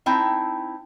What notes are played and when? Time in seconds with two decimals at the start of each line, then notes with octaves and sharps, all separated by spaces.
0.06 C4 D#4 E4 G5 A5